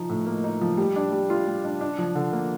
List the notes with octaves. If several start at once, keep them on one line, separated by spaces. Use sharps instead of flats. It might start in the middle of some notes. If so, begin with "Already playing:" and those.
Already playing: F3 D#4
A2
A#3
D#4
F3
G3
D4
G3
F4
G3
D4
D4
F3
D3
A#3